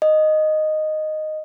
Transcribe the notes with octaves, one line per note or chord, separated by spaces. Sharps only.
D#5